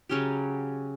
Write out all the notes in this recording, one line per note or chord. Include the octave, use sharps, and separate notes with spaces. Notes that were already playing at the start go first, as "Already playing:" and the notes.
C#3 F#3 C#4 G4